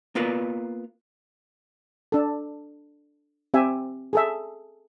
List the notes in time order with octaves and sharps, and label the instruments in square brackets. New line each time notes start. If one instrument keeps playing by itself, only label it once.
[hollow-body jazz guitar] A#3 B3 F4 A#4 B4
[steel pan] D4 A4
C4 G4 E5 G#5
G#4 A4 E5